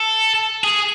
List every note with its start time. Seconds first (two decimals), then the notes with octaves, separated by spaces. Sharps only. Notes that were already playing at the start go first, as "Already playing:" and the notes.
Already playing: A4
0.64 G#4